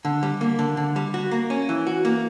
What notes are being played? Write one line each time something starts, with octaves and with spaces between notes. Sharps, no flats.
D3
G3
A#3
D3
D3
G3
F#4
A#3
C#4
E3
F#4
A#3